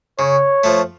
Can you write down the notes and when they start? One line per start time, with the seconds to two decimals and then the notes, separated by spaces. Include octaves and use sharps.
0.19 C#3 C#5
0.64 F3 A3